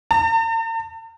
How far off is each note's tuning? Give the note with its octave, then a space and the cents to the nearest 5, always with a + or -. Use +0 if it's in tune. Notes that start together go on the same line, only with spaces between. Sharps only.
A5 +45